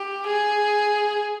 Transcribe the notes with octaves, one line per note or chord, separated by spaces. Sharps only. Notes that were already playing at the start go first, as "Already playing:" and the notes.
Already playing: G4
G#4